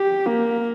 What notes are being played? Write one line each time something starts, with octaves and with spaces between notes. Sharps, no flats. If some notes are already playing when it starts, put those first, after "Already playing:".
Already playing: G4
A#3